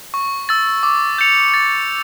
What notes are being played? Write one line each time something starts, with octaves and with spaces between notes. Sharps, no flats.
C#6
E6 A6
D6
G6 C#7 F7
A6